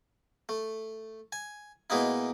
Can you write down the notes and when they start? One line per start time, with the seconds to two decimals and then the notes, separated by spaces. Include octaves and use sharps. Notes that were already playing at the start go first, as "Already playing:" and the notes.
0.49 A3
1.32 G#5
1.90 B2 G#3 A#3 D#4 E4